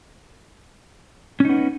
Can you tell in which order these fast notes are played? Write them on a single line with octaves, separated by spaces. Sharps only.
C#4 D#4 B3